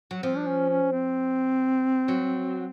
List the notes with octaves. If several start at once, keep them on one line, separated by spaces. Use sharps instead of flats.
F#3
F3 C4
D4
C#4
C#4
C4
F#3